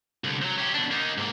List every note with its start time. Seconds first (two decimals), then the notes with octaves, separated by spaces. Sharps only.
0.24 C2 D3
0.42 F3 F#3
0.58 C#4 G4
0.74 B2 D4
0.91 A#3 D#4
1.18 G#2 A#3